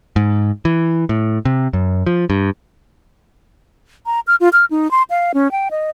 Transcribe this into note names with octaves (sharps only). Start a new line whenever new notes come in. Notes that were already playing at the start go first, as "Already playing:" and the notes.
G#2
E3
A2
C3
F#2
F3
G2
A#5
F6
F4
F6
D#4
C6
F5
C#4
G5
D#5